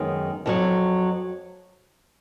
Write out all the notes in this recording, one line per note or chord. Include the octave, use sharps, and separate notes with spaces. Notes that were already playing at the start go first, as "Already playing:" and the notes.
Already playing: F#2 D#3 G#3 B3
F2 D#3 F#3